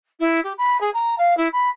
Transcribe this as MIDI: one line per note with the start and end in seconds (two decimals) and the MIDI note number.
0.20 0.40 64
0.44 0.53 67
0.58 0.79 83
0.81 0.90 68
0.94 1.15 82
1.18 1.36 77
1.37 1.48 64
1.53 1.69 83